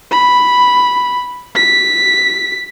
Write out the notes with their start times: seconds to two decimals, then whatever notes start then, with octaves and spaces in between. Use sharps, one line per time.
0.11 B5
1.55 B6